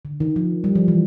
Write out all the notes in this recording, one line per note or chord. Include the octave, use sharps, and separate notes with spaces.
D3
D#3
F3
G3
F3
E3